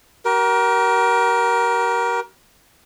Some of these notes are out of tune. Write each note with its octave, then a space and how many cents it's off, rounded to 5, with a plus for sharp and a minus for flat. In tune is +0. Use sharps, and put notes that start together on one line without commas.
G4 -45 A#4 +20